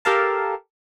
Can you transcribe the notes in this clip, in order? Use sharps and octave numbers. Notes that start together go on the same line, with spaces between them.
G4 A4 A#4 F5 A5